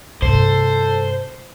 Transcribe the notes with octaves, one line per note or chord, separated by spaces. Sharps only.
G2 C3 A4 C5